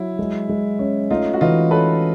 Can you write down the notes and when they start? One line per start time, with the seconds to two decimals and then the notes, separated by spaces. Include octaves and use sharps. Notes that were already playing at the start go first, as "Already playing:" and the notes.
Already playing: F#3 E4
0.19 G#3
0.49 G#3
0.79 C#4
1.10 A3 D#4 F4
1.34 F#4
1.41 E3 D#4 F4
1.71 C#4 A4 B4